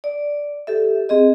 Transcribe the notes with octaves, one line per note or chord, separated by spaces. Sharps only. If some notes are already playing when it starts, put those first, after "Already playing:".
D5
G4 A4 E5
C4 G#4 D#5